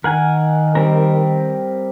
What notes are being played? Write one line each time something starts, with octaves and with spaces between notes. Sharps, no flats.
D#3 A#4 F#5 G#5
G3 C4 A#4